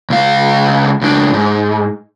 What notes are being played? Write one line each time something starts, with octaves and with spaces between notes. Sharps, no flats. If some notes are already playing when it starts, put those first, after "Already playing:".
C#2 F5
C#2 D4
G#2